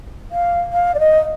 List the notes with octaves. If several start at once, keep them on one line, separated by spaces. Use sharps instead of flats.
F5
F5
D5
D#5